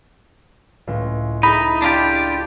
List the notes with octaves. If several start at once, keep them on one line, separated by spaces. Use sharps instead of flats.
C#2 A2
D#4 E4 G#4 A4 B5
D4 F4 G4